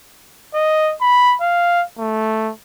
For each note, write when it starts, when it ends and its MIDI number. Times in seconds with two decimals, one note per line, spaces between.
0.54 0.94 75
1.01 1.36 83
1.41 1.84 77
1.99 2.52 57